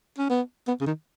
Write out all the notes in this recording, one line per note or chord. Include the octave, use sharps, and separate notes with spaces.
C#4
B3
B3
C#3
D#3